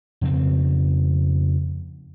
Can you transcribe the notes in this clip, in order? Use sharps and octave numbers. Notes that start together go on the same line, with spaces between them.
F2 C#3 B3 C4